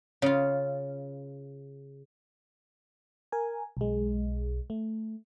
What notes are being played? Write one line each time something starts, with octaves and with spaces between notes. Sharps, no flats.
C#3 F4
A#4 G#5
B1 G#3
A3